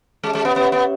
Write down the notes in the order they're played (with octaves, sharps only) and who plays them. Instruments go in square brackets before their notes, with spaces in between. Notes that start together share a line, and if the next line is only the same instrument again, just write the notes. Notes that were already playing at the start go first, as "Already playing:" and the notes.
[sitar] G#3 [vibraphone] C#4 G4 C#5 E5
[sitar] G#3
B3
[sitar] B3 [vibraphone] C#4 G4 C#5 E5
[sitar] B3